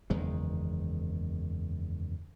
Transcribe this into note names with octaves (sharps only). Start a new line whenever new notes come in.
F#1 E2 D#3 G#3